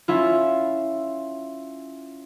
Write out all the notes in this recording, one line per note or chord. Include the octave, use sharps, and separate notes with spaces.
C#4 E4 F4